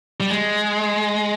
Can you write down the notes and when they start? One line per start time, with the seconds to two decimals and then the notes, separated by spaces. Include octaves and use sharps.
0.20 G3
0.30 G#3